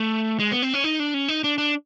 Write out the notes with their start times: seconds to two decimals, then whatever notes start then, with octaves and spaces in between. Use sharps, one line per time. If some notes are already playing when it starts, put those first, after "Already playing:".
Already playing: A3
0.39 G#3
0.52 B3
0.62 C4
0.74 C#4
0.84 D#4
1.00 D4
1.14 C#4
1.28 D#4
1.44 D4
1.58 D4